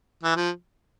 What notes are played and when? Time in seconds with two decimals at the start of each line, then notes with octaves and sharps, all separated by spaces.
0.23 E3
0.36 F3